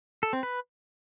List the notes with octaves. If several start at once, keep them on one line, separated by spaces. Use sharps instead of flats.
A4
C4
B4